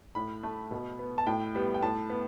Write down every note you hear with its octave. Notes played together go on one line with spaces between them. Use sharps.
A2 B5
A3
B2
B3
A5
A2 G5
G3 B3
G5
A2 A5
B3